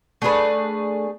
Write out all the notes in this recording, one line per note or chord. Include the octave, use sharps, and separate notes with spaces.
A3 D4 G#4 B4